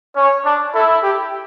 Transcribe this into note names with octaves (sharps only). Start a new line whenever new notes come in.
C#4 C#5
D4
E4 A4
G4